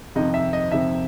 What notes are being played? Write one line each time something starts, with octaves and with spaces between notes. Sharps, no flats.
F2 C3 D#3 D#5
E5
D#5
F2 C3 D#3 E5